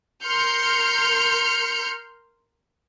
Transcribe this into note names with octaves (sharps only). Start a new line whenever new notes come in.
A#4 C6 F6 G6 C#7